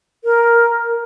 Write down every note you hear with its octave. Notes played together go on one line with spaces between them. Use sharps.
A#4